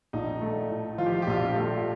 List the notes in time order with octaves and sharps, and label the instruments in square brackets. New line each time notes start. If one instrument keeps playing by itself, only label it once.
[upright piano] A#1 [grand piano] D#4
[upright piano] A3
A2
[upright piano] F3 [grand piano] F4
[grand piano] G4
F4
G4
[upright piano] A#1 [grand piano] F4
[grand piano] G4
F4
G4
[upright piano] A3 [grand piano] F4